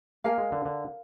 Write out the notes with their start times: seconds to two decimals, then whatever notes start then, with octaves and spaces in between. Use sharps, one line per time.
0.24 A#3 A#4 F5 G#5
0.38 G#3
0.52 D3
0.65 D3